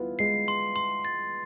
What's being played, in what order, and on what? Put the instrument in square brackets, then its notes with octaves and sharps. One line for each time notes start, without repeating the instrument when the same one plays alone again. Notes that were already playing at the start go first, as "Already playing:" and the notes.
Already playing: [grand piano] B3 E4 F4
[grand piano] G#3 [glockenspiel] C7
[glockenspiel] C6
C6
A6